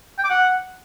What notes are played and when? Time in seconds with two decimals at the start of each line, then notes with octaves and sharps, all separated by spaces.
0.19 G5
0.24 D6
0.30 F#5